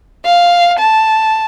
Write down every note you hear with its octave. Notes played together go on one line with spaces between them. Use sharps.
F5
A5